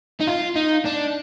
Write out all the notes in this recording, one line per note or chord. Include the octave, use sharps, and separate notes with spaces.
D#4
F4
D#4
D4